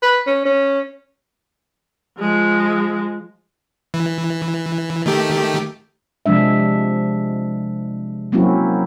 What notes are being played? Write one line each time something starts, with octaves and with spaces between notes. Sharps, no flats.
B4
C#4
C#4
F3 G#3
E3
D#3 A3 G4
C3 F3 G#3 D4 E5
F#3 A#3 C4 C#4 E4 F#4